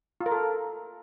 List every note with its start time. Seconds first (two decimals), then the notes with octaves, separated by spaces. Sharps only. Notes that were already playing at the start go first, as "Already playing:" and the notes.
0.21 F4
0.26 A#4
0.31 A4